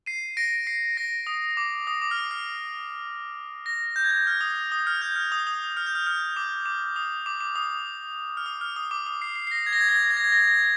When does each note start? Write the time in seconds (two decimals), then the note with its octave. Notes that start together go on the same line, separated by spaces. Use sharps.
0.06 C7 D#7
0.37 A#6 D7
0.67 C7
0.97 A#6
1.27 D#6
1.57 D6
1.87 D#6
2.02 D6
2.11 F6
2.17 D#6
2.31 F6
3.66 A#6
3.96 G6
4.04 G#6
4.11 G6
4.27 F6
4.41 D#6
4.72 D#6
4.87 F6
5.02 G6
5.16 F6
5.32 D#6
5.47 D#6
5.77 F6
5.86 G6
5.95 F6
6.07 F6
6.36 D6
6.66 D6
6.96 D#6
7.26 D6
7.41 D6
7.56 D#6
8.37 F6
8.46 D#6
8.61 F6
8.76 D#6
8.91 D6
9.06 D#6
9.22 C7
9.36 C7
9.47 C7
9.51 A#6
9.66 G#6
9.73 A#6
9.81 G#6
9.89 A#6
9.96 G#6
10.03 A#6
10.10 G#6
10.17 A#6
10.24 G#6
10.32 A#6
10.39 G#6
10.47 A#6
10.54 G#6
10.61 A#6